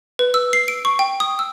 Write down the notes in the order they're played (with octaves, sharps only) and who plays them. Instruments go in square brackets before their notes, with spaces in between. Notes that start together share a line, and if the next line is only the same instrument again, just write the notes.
[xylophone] B4
E6
C7
D7
C#6
G5
D#6
E6